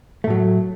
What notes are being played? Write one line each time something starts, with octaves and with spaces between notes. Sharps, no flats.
A2 F#3 A3